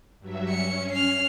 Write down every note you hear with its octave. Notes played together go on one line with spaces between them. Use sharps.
G2 F#3 E5
C#4 C#7
F6 C7